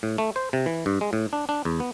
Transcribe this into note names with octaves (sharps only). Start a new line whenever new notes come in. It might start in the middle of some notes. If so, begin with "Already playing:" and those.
A2
A3
C5
C3
E3
G2
G#3
A2
D4
D4
E2
B3